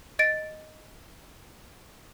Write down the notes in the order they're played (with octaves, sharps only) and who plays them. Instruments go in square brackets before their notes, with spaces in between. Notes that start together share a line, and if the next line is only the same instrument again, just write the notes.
[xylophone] D#5 A6 D7